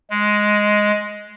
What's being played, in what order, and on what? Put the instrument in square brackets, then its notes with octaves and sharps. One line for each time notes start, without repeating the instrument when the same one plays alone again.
[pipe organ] G#3